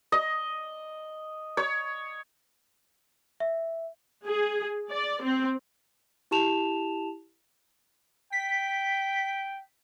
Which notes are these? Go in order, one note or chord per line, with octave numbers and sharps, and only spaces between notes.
D#5
C#5
E5
G#4
D5
C4
E4 G4 A5 E7 F7
G5 B6